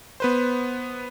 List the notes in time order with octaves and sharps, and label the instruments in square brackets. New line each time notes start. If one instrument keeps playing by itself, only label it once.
[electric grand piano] B3 B4 C5